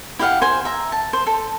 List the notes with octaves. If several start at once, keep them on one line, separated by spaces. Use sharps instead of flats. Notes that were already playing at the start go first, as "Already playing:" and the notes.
E4 G4 F5 F#5
C5 G#5
E5 A#5
A5
C5
A4